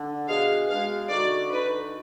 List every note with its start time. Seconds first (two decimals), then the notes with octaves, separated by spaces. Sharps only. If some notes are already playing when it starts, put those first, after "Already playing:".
Already playing: D3
0.28 B2 G#3 D4 G#4 F5
0.69 B2 G#3 D4 G#4 F5
1.10 D3 G#3 D#4 F#4 D5
1.50 D3 G#3 D#4 F#4 B4